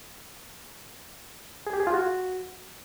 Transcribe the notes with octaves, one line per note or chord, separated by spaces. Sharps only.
G#4
G4
G#4
F4
F#4